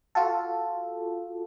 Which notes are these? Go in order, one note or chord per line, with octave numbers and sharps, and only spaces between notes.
F4 F#4 A4